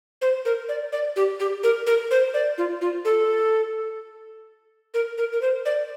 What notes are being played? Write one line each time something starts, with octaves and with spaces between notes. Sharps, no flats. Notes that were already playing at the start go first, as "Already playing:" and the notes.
C5
A#4
D5
D5
G4
G4
A#4
A#4
C5
D5
F4
F4
A4
A#4
A#4
A#4
C5
D5